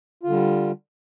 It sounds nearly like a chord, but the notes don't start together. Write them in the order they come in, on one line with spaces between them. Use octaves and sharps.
F4 D3 G3